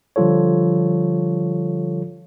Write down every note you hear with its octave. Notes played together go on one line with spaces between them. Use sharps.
D3 F3 G3 F4 A4 C#5